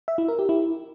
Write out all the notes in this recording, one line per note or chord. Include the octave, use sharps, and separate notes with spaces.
E5
E4
A#4
G4
E4